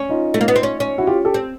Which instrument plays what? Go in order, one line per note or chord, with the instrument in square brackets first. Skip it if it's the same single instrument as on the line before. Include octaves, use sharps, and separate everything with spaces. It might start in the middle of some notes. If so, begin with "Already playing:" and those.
Already playing: [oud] C#4
[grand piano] D#4 F4
[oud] A3
A#3
B3
C4
C#4
C#4
[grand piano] E4 F#4
F4 G4
G4 A4
[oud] C4